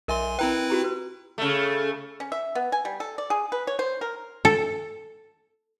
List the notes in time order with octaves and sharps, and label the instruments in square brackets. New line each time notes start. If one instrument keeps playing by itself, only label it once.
[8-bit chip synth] B1 G#5 C6 [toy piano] A#4 D#5 E5
[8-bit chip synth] C4 E4 B4 [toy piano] G5 A#5
[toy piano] F#4 G4 A#5
B4
[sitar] C#3 A3
[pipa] C#4
E5
B3
G#5
G3
A4
D5
G#4
B4
C#5
C5
A#4
[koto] A4